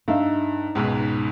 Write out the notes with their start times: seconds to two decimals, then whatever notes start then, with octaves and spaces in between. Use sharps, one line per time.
0.08 G2 D#4 E5 F5
0.75 C#2 G#2 B2